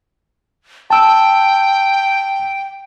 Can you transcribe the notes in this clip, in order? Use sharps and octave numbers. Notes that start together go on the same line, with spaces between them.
G5 A5 E6